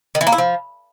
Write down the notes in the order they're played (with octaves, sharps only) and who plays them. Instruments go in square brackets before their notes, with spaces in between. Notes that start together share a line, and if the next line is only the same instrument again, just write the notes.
[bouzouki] D#3
E3
A#3
E4
F3